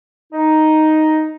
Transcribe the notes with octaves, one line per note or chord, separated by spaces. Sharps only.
D#4